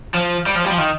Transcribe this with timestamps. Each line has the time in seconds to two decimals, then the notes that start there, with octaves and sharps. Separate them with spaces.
0.15 F3
0.47 G3
0.56 F3
0.65 G3
0.70 F3
0.78 D#3